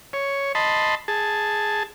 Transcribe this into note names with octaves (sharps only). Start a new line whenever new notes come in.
C#5
D#5 A5 B5 C6
G#4 A5